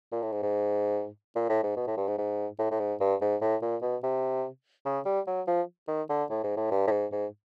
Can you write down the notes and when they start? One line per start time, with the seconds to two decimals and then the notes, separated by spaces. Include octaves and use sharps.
0.12 A#2
0.23 A2
0.32 G#2
0.43 G#2
1.36 A#2
1.49 A2
1.63 G#2
1.76 B2
1.87 A2
1.97 G2
2.07 G#2
2.18 G#2
2.59 A2
2.71 A2
2.80 G#2
3.00 G2
3.21 G#2
3.41 A2
3.62 A#2
3.82 B2
4.03 C3
4.85 C#3
5.06 G3
5.27 F#3
5.47 F3
5.88 D#3
6.09 D3
6.30 A2
6.43 G#2
6.57 A2
6.71 G2
6.87 A2
6.91 G#2
7.12 G#2